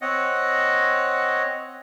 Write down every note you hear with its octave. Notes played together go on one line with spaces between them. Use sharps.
C4 C#5 D#5 F#5